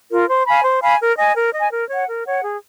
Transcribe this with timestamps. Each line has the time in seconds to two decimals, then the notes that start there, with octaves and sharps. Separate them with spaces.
0.10 F4 A#4
0.29 C5
0.46 F5 G#5 B5
0.64 C5
0.82 F5 G#5 B5
1.00 A#4
1.17 D#5 G#5
1.36 A#4
1.54 D#5 G#5
1.72 A#4
1.89 C#5 F#5
2.07 A#4
2.26 C#5 F#5
2.43 G#4